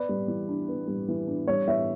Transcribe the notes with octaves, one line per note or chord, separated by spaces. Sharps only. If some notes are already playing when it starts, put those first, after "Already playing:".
Already playing: B3 B4 D5
G3
E3
D4
B3
G3
E3
D4
G3 C#5
E3 C#5 E5